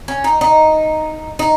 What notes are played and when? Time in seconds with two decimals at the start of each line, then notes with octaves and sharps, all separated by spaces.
0.08 C#4
0.24 D#4
0.41 D#4
1.39 D#4